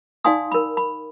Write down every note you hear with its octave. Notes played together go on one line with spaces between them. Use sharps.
D#4 D5 F5 G#5 C6 D#6
A#4 B5
B5